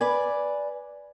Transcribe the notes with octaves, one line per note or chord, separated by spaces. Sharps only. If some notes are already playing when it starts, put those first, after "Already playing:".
B4 D5 G#5